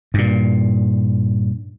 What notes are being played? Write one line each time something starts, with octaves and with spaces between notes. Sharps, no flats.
G2 A#2